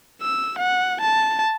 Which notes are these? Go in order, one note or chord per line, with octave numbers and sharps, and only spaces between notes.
E6
F#5
A5